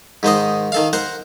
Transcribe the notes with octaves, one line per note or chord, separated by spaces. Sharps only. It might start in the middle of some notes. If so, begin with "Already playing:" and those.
G#2 D#3 C5 D#5
D#3 A4 F5
A#4 C5 F#5